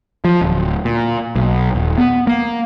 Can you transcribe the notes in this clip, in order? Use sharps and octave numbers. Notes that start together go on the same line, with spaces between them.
F3
D1
A#2
B1
D#1
B3
A#3